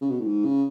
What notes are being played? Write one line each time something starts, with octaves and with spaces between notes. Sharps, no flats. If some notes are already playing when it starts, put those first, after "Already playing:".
C#3
B2
A2
G#2
C#3